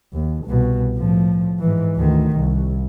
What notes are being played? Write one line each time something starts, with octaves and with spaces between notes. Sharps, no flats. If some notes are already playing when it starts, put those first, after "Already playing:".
D#2
C2 B2
A2 F3
G#2 E3
D2 D#3
C2